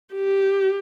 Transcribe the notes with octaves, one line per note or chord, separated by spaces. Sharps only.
G4